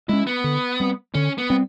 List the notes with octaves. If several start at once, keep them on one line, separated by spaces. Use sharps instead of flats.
G#3 C#4 E4
B3
D3
G3 C4
D3 C#4
B3
G3 C4